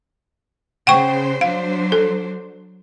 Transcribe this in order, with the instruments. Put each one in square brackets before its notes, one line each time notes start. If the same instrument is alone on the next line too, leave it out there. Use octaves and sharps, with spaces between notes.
[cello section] C#3 C5 [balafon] F#5 G5 C#6
[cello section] F#3 D4 C5 [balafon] F5
[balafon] A4